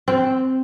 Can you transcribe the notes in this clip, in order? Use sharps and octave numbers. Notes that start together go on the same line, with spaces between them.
C4